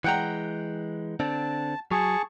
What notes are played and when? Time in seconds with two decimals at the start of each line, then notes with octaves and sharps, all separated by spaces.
0.04 E3 G#3 F#5 G5 A#5
1.20 D3 C4 D4 A5
1.91 F#3 G#4 A5 C#6